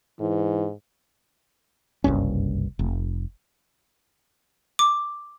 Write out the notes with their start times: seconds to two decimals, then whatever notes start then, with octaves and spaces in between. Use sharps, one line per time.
0.21 G#2 E3
2.04 F#1 C2 G2 C#4
2.79 F1
4.79 D6